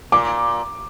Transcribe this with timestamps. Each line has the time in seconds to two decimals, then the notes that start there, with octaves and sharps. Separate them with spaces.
0.12 A#2 D6